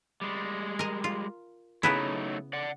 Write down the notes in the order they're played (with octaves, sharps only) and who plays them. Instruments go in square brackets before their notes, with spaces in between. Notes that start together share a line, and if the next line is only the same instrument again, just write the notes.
[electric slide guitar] G3 G#3
[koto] A#4 D#5
F4
[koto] C#3 B3 E4 [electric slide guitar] F#3 A3 D#4
[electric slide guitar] D5 F#5